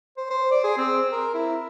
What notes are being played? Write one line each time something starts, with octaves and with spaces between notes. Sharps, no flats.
C5
C5
D5
G#4
C4
A#4
E4